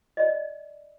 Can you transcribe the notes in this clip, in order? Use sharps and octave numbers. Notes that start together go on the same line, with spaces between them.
D5 D#5